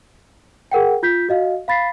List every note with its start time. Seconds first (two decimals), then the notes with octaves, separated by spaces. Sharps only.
0.72 G#4 A#4 F#5 G5
1.03 F4 G6 B6
1.29 F#4 D#5 F5
1.68 F5 B5 A6 B6 C7